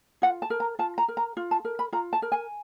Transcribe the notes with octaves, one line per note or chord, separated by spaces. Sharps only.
F4 F#5
A5
A#4
A#5
F4 A5
A#5
A#4
A#5
F4
A5
A#4
B5
F4 A#5
A5
A#4
G#5